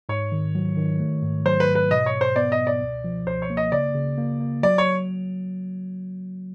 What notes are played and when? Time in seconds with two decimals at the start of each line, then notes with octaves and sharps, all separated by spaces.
0.09 G#2 C#5
0.32 D#3
0.55 F#3
0.77 D#3
1.00 A3
1.22 G#2
1.46 F#3 C5
1.60 B4
1.68 G#2
1.75 B4
1.91 B2 D#5
2.06 C#5
2.14 B2
2.21 C5
2.36 B3 D5
2.52 D#5
2.59 B2
2.67 D5
2.81 C#2
3.04 F3
3.27 C#2 C5
3.42 C#5
3.50 A#3
3.57 D#5
3.72 C#3 D5
3.95 C#3
4.18 A#3
4.40 A#3
4.63 F#3 D5
4.78 C#5